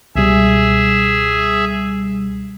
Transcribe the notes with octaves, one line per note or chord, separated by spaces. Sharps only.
C#2 B2 G3 G#4 E5